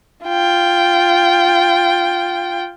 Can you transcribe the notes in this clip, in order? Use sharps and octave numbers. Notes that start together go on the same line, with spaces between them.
F4 G5